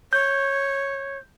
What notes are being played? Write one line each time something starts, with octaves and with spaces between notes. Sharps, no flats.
C#5 G6